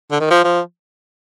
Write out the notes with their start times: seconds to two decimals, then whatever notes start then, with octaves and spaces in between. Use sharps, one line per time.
0.11 D3
0.20 D#3
0.31 F3
0.44 F3